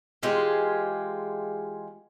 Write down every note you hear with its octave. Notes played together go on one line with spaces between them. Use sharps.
E3 G#3 F4 G4